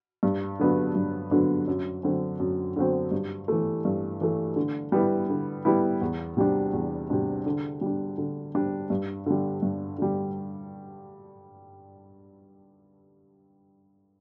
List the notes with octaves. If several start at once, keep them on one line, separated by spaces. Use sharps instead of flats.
G2
D3 F#3 B3 D4
G2
D3 F#3 B3 D4
F#2
D3 F#3 C4
F#2
D3 F#3 C4
G2
E3 A3
G2
E3 A3
D3
G3 B3 E4
D3
G3 B3 E4
E2
C3 G3 D4
E2
C3 G3 D4
D3
G3 D4
D3
G3 D4
G2
D3 G3
G2
D3 G3